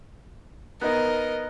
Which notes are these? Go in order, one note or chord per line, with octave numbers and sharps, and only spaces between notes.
B3 D#4 A#4 D#5